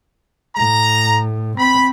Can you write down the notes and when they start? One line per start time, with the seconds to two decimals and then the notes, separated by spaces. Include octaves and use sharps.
0.56 A2 A#5
1.58 C4 B5